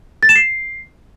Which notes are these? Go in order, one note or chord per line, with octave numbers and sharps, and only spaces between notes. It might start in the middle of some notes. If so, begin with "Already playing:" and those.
A6
E7
C7